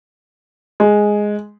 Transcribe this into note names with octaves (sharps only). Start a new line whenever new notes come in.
G#3